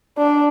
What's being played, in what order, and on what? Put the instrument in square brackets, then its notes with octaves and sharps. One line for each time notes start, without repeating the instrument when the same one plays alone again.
[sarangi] D4